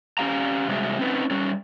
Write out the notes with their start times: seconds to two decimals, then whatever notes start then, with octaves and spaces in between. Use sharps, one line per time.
0.18 C#4 G4 F5 A#5
0.68 C3 G3 G#3 F#4 G#4 E5
0.99 C4 C#4 D#4 B4
1.30 G3 C#4